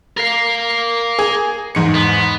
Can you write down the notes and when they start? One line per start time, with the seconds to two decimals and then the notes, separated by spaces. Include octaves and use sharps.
0.17 A#4 F5
1.19 G#4
1.75 E2 G#2 C#7
1.94 B3